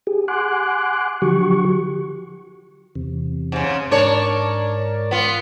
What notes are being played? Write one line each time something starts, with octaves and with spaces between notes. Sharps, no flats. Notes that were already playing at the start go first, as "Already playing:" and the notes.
G4 G#4
F#5 G#5 C6 D6 F#6
D3 F3 F#3 F#4 G4 C#6
E2 C3
G#2 C#3
G#2 D4 A#4 C#5 D5
B3 F4